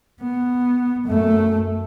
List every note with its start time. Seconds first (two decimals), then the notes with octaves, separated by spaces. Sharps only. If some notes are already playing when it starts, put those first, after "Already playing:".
0.22 B3
1.06 F#2 A3